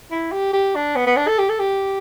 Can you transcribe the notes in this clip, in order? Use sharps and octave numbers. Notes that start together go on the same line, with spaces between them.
E4
G4
G4
D4
B3
B3
D4
A4
G4
A4
G4